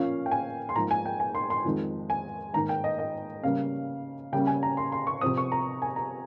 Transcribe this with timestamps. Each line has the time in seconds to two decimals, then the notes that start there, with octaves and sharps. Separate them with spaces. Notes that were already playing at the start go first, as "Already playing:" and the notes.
Already playing: A#2 F3 A#3 C#4 F5
0.26 G5
0.31 G#5
0.69 C6
0.76 G#2 F3 A#3 A#5
0.91 G#5
1.06 G5
1.20 G#5
1.35 C6
1.50 C6
1.65 F2 D#3 G#3 C4
2.10 G#5
2.54 G#2 D#3 A#3 A#5
2.69 G5
2.84 D#5
2.99 D#5
3.43 C#3 G3 A#3 C#4 F5
4.33 C#3 G3 A#3 C#4 G5
4.47 G#5
4.63 A#5
4.77 C6
4.92 C6
5.07 C#6
5.21 C3 F3 C4 D#6
5.37 C#6
5.52 A#5
5.82 G#5
5.96 A#5